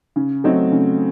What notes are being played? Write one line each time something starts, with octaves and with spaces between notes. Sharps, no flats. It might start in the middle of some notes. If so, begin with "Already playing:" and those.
C#3
F#3 A3 C4 D#4
C#3